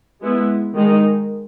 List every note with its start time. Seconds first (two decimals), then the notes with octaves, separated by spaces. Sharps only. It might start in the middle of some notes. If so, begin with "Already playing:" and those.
0.21 G#3 B3 E4
0.74 D#3 G#3 D#4